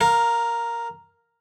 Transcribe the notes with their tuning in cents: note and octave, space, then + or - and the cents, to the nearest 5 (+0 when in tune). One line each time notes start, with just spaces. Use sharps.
A#4 +0 F5 +20